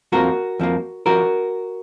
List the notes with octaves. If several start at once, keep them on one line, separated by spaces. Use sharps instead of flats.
F2 F3 A#3 F#4 A#4
F2 F3 A#3
F3 F#4 A#4